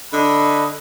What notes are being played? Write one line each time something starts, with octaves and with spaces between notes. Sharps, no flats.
D3 D4 D#5 B5